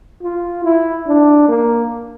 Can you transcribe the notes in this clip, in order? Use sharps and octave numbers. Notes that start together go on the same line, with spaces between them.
F4
E4
D4
A#3